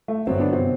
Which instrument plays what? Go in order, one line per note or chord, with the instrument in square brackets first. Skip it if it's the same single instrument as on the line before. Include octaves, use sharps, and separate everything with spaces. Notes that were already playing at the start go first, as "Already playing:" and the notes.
[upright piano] A3
[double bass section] G1 F#2 F#3 B3 [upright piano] C4
[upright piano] D4
C3 C4